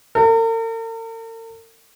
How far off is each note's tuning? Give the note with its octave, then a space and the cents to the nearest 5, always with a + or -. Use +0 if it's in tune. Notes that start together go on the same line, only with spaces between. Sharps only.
A#4 -45